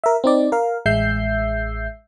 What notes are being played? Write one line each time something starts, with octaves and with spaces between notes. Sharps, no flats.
A#4 E5
C4 D#4 D5
A#4 F5
A1 G#3 E5 E6 G6 C7